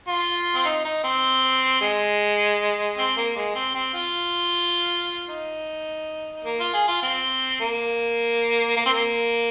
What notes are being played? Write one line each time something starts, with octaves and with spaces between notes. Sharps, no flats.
F4
C4
D#4
D#4
C4
G#3
C4
A#3
G#3
C4
C4
F4
D#4
A#3
F4
G#4
F4
C4
A#3
A#3
C4
A#3